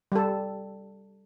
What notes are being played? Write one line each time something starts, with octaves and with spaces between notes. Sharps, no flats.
G3 A4